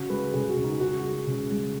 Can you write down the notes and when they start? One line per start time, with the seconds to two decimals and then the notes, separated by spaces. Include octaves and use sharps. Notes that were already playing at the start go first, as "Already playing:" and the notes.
Already playing: C#3 F#4
0.10 G#3 B4
0.34 C#3 G#4
0.49 F#4
0.57 C#3
0.64 D#4
0.80 G#3 F#4
1.03 G#3
1.27 C#3
1.51 G#3